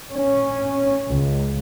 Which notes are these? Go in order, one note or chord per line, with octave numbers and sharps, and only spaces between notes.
C#4
C#2